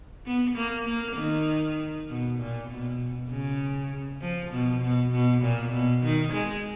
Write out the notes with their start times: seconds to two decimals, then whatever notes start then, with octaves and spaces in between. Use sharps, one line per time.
0.26 B3
0.56 A#3
0.87 A#3
1.16 D#3
2.09 B2
2.39 A#2
2.69 B2
3.30 C#3
4.21 F3
4.51 B2
4.82 B2
5.12 B2
5.42 A#2
5.72 B2
6.04 D#3
6.33 G#3